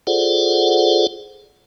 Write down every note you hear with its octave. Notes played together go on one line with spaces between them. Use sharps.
F4 G#4 A4 C5 D5 F#5